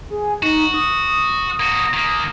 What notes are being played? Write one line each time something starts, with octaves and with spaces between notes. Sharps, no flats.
G#4
D#4 F#4
D#6
A#3 F#4
D#3 A#3